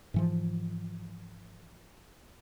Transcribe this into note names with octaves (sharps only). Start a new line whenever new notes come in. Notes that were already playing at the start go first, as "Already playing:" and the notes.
G#2 E3 F3